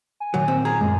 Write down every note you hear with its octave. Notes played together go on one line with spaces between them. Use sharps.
G#5
A#2 D#3 F#3
C4
F4 G#4 A#5
F#2 G#3